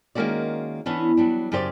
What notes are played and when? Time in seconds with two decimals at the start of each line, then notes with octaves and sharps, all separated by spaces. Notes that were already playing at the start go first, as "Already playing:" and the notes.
0.15 D#3 G#3 A#3 C#4 F#4 D5
0.86 E3 B3 C#4 D4
1.17 F#3 G3 D4
1.52 F#2 C#3 G4 C5 D5